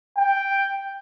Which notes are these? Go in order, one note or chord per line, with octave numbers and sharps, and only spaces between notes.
G5